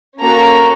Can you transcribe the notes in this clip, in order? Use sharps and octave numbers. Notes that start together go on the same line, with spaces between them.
A#3 C#4 F#4 A4 A#5